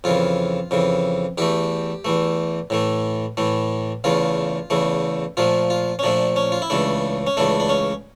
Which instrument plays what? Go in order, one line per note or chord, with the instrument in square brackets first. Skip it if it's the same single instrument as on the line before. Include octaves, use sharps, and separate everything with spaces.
[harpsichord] F2 C#3 E3 F4
F2 C#3 E3
E2 E3 A3 G4
E2 E3 A3
A2 E3 A3
A2 E3 A3
E2 C#3 E3 A3 F4
E2 C#3 E3 A3
A#2 F3 A3 F4
F4
C#4
A#2 F3 A3 D4
C#4
F4
E4
C#2 C#3 E3 A3 D4
C#4
C#2 C#3 E3 A3 D4
D4
C#4